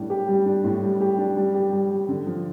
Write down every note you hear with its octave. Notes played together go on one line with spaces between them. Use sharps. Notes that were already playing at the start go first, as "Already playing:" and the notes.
Already playing: A2 G3 D4
G4
G3
D4
A2
G3
G4
D4
G3
G4
G3
G3
D3
F3